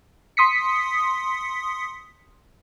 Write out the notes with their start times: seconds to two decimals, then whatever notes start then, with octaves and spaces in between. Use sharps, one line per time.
0.37 C6 D#6 B6 C#7